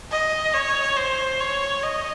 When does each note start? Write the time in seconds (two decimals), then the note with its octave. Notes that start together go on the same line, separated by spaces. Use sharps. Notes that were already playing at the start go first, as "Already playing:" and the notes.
0.12 D#5
0.54 C#5
0.97 C5
1.41 C#5
1.83 D#5